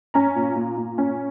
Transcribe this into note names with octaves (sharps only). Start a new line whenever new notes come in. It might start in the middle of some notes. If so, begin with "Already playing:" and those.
C#4 A#5
A#2
A#2
A#2
C#4